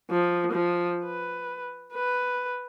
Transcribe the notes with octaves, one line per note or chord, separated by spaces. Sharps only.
F3
F3
B4
B4